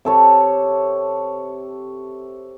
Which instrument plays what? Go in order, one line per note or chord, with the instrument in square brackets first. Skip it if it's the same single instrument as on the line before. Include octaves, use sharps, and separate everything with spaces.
[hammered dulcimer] C3 A4 C#5